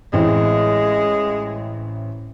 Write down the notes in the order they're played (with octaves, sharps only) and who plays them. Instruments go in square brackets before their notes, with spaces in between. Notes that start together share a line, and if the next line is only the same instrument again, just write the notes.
[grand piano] A1 E3 C4 [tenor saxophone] G#3